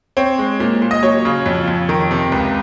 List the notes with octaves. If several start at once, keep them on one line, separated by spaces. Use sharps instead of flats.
C4 C#5
G#3
A#2
A#2
D#5
F#3 C#5
C#3
F2
F2
D#3 A#4
C3
C#2